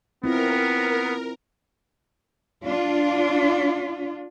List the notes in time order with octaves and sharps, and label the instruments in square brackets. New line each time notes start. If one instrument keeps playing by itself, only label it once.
[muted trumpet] B3 [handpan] C4 E4 F4 [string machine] A#4
[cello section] D4 F4